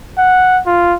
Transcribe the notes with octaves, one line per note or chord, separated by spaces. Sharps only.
F#5
F4